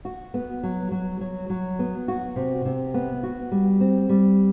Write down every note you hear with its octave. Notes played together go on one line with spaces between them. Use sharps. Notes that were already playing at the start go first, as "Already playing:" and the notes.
F#4
B3
F#3
F#3
F#3
F#3
B3
F#4
C3
C3
B3
F#4
G3
C4
G3